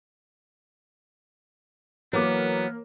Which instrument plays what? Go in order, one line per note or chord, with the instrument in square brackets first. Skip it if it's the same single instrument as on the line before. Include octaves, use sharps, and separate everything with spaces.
[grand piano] E3 D6 [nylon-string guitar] F#3 [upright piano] A#3 A#4 [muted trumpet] B3